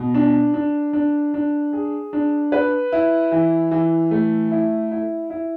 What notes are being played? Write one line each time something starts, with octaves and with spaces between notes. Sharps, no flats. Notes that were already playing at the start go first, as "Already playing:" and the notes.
Already playing: B2
D4
D4
D4
D4
G#4
D4
B4
E4
E3
E3
A3
E4
E4
E4